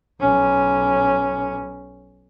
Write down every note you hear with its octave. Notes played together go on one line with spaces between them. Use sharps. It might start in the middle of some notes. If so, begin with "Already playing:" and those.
B1 C#4